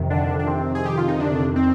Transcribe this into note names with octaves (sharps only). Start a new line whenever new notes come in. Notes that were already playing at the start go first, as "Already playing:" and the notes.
Already playing: F2 C3 D#3
D3 D4
D4
C4
G#4
G4
F4
D#4
D3 D4
C4